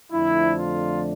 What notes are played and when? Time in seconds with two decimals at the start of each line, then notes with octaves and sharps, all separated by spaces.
0.11 F2 D3 F3 A3 D4 E4
0.59 F4